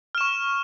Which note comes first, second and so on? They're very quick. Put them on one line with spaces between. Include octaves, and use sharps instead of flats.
F6 E7 C#6